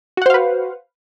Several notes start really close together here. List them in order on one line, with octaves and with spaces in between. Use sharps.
F#4 F#5 C5 F5 B4